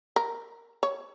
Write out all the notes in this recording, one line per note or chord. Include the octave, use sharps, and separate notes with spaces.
A#4
C#5